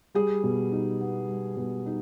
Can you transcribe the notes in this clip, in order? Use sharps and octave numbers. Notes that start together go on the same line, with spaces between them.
G3 G#4
B2
D#4
B3
G3
B2
D#4